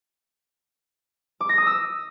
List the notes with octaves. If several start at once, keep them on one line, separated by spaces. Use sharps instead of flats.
D6
A#6
D#6
E6